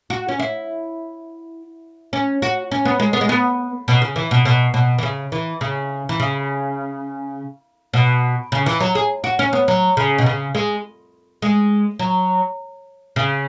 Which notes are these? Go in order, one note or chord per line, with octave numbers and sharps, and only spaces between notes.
F#4
C#4
E4
C#4
F#4
C#4
B3
G#3
B3
G#3
B3
B2
C#3
E3
B2
B2
B2
E3
C#3
E3
C#3
E3
C#3
B2
C#3
E3
F#3
G#4
F#4
C#4
B3
F#3
C#3
B2
C#3
G#3
G#3
F#3
C#3